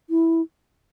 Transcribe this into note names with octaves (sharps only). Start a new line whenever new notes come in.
E4